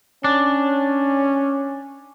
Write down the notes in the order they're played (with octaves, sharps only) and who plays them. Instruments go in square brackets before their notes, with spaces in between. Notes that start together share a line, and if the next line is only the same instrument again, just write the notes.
[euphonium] C#4 [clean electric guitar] D4